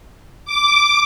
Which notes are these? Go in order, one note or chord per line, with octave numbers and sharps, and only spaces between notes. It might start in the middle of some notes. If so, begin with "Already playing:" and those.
D6